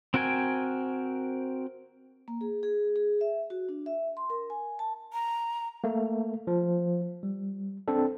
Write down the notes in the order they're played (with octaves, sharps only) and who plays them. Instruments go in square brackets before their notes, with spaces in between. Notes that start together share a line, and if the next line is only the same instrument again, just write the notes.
[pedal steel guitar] C4 F#4 A#4 G5 G#5
[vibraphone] A#3
G#4
G#4
G#4
E5
F#4
D4
E5
C6
A#4
G#5
A5
[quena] A#5
[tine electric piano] A3 A#3
F3
G3
C4 D4 A4